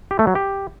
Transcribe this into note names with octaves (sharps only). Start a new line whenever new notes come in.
G4
A3
F#3
G4